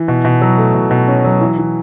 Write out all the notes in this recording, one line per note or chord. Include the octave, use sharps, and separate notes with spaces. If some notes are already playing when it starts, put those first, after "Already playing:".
Already playing: E3
B2
B2
F#3
A3
B2
B2
C#4
F#3
E3
E3